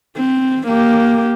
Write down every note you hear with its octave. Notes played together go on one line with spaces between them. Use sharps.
C4
A#3 G4